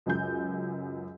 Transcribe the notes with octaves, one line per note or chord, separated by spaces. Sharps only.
C#2 F#2 G#5 G6